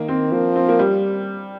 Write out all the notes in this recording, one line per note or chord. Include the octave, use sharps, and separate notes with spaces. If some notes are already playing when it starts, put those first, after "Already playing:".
Already playing: D#3 A#3
C4
F3 A#3
C4
A#3
G3